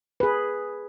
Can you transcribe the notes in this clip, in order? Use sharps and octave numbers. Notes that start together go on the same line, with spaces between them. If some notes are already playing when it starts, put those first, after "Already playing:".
G#4 B4